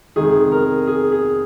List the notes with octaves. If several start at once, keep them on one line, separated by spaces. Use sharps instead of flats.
F2 C3 D#3 G#3 G#4
A#4
G#4
G#4